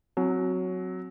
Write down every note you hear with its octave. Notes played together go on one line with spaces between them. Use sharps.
F#3 C4